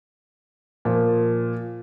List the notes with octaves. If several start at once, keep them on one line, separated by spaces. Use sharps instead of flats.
A#2 F3